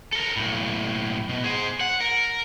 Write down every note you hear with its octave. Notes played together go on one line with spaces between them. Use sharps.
A4 A#4
B1 A2
B2
G#4 C5
F#5
A#4